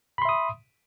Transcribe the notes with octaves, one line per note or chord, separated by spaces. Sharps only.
E5 B5 C6 D#6